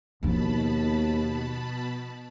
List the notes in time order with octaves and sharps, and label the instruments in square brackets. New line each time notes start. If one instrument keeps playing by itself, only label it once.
[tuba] D#2 [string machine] B2 A5 B5 [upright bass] F3 D#4